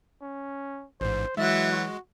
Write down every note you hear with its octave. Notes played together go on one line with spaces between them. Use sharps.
C#4
A1 G#2 C5
E3 F#3 G#3 E5
F#4